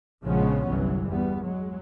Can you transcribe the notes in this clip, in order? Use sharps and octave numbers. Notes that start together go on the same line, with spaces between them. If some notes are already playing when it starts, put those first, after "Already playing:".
A#1 C#3 F3 G#3 B3 C#4
G1 C2 E3 F#3
E2 G3 B3
F#3 G#3